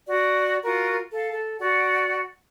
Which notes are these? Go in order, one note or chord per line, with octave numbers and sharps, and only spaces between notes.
F#4 D5
F4 F#4 A#4
A4 F5
A4
F#4 D5 F#5